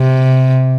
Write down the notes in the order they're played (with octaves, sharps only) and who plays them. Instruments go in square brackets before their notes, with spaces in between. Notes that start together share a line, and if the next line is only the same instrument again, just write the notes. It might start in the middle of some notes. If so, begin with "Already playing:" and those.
Already playing: [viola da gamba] C3